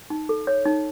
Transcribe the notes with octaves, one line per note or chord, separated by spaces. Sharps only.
D#4
A4
C#5
D#4